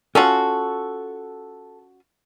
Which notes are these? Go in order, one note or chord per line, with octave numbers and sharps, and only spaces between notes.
C#4 F4 F#4 A4 A5